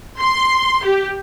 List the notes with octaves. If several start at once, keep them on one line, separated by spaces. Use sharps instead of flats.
C6
G4